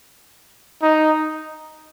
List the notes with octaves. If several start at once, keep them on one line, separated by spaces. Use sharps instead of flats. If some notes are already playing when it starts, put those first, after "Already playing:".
D#4